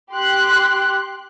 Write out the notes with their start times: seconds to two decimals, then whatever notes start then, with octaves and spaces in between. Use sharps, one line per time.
0.12 G4 C6 F#6